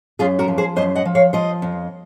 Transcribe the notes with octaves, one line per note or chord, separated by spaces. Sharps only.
F#2 F4 G#4
F#4 A#4
F3
G#4 C5
F#2 C5 D#5
D#5 F#5
F3
C#5 F5
F3 C5 D#5
F2